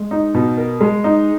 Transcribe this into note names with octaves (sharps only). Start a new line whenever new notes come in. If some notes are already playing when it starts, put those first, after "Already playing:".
Already playing: G#3
D#4
B2
A#4
G#3
D#4